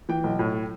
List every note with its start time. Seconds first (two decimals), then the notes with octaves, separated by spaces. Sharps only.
0.09 E3 G5
0.24 B1
0.39 A2